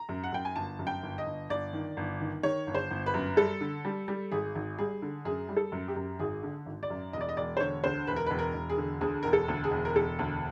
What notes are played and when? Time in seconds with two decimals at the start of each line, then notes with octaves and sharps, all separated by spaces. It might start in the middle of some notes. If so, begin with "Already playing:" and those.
Already playing: A#5
0.09 F#2
0.23 F#5
0.32 F#2 G5
0.45 G#5
0.56 G1 A5
0.79 F#2
0.87 G5
1.03 G1
1.18 D#5
1.26 G1
1.50 G1 D5
1.73 D#3
1.97 G1
2.20 D#3
2.43 D#3 C#5
2.67 G1
2.75 C5
2.91 G1
3.06 B4
3.14 F#2
3.37 G3 A4
3.61 D3
3.85 G3
4.08 G3
4.32 G#1 G#4
4.55 G#1
4.78 G3 G#4
5.02 D3
5.25 F#2 G#4
5.49 G3
5.57 A4
5.72 F#2
5.88 G4
5.96 F#2
6.19 G#1 G#4
6.43 D3
6.66 G#1
6.83 D5
6.90 F#2
7.13 E1 D#5
7.21 D5
7.29 D#5
7.37 E1 D5
7.57 C5
7.60 D3 C#5
7.84 D2 C5
8.07 E1 B4
8.16 A#4
8.26 E1 B4
8.39 A#4
8.54 E1
8.70 G#4
8.78 D3
9.01 D2 G#4
9.23 E1 A#4
9.33 A4
9.48 D2
9.64 G#4
9.71 E1
9.85 A#4
9.96 E1 A4
10.19 D2